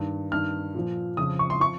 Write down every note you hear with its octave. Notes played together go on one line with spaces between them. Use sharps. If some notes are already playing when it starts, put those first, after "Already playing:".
Already playing: G2 D#3
G2 D#3 F6
A#2 F3
F2 C#3 F3 D#6
C#6
C6
F3 C#6